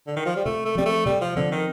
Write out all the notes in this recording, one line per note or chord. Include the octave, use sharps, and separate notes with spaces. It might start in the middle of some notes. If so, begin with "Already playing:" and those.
D3
D#3
F3
G3
C3 A3
A3
F3 G3 C4
A3
C3 G3
F3
D3 F3 C4
D#3